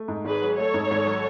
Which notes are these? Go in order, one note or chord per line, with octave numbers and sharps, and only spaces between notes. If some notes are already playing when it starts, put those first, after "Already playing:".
Already playing: A3
G#2
G#1 G#4 B4
F#3
A3 A4 C#5
G#2
G#1
F#3